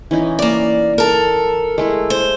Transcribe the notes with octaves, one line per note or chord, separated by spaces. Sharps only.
E3 C#4 D#4
A#3 D5
A4 A#4
G#3 A3 E4
C5